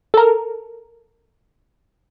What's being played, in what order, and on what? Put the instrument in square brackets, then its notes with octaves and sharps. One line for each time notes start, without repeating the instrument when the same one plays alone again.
[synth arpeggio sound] A4 A#4